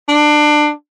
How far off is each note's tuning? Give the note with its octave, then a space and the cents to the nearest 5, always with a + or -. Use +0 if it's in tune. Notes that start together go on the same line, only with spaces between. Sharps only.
D4 +20